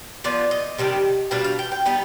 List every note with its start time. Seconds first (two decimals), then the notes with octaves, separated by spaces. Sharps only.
0.24 F3 B3 F4 D5
0.51 D#5
0.78 C3 D#3 G3 D4
1.31 B2 G3 D4 F5
1.44 F5
1.59 G5
1.72 G5
1.86 G3 B3 D#4